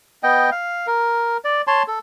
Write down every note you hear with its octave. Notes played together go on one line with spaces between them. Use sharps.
B3 D#5 G5
F5
A#4
D5
C#5 A5 C6
A4